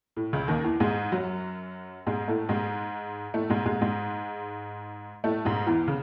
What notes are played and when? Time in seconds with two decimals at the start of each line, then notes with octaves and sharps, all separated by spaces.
0.17 A2
0.33 C#2 C#3
0.48 D#2 D#3
0.64 E2 E3
0.80 G#2 G#3
1.12 F#2 F#3
2.07 G#2 G#3
2.28 A2 A3
2.49 G#2 G#3
3.34 A2 A3
3.50 G#2 G#3
3.65 G#2 G#3
3.81 G#2 G#3
5.24 A2 A3
5.45 G#2 G#3
5.66 E2 E3
5.88 C#3